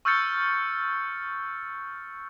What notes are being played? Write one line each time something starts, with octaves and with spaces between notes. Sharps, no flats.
C#6 E6 F6 G6 A6 C#7